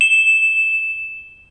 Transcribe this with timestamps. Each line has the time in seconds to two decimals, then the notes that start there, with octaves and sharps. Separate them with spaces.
0.01 E7